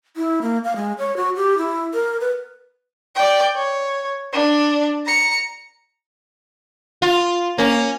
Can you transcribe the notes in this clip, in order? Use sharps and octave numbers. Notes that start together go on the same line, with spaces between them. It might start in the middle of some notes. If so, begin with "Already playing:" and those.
E4
A#3
F5
G#3
C#5
F#4
G4
E4
A#4
B4
D5 G5
C#5
D4
A#5 C#7
F4
A#3 C#4